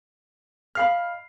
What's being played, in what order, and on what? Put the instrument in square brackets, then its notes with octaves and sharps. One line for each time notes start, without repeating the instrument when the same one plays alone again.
[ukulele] D#5 F5 B5 [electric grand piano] F6 C7